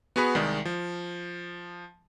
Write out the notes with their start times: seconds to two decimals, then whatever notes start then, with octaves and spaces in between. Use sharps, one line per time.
0.16 B3 F#4 G#4 B4 B5
0.35 C2 D#3 G#3 D5
0.65 F3